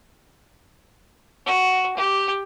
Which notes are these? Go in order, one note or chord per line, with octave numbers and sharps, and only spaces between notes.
F#4
G4